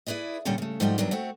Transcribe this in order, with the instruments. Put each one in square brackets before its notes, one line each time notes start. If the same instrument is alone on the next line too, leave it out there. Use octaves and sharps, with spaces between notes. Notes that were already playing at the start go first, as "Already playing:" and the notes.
[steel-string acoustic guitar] E4 G#4 B4 D5 D#5
A#2 D3 G3 C#4 G4 A4
C#3 A3
G#2 F3 G3 A3 F#4 G4
E2 G2 F#3 D4 A#4
A3 C4 F#4